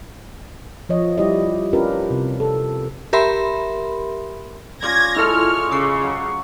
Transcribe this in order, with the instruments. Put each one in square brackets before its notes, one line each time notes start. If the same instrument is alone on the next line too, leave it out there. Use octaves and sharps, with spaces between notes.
[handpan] F3 C#5 D#5
G3 E4 G4 D5 D#5
C#4 D4 F4 G4 A#4 B4
C3
A4
[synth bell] G4 A#4 E5 B5 C6
[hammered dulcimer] C#4 F4 D5 [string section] G#6 A#6
[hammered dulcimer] G#3 [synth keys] E4 F4 A4 [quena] C#6 [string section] F6
[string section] C#3 [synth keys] D6 E6 C7
[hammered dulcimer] F#3